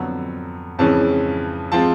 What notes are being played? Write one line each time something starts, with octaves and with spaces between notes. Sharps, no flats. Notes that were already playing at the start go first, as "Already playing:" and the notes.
Already playing: F2 D3 F#3 B3
F2 C#3 E3 G#3 C#4 A5
F3 G#3 C4 A5